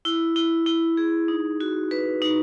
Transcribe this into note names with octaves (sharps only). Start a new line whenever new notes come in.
E4
E4
E4
G#4
D#4
F#4
B4
D#4